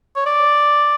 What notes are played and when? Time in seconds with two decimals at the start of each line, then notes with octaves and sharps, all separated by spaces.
0.16 C#5
0.26 D5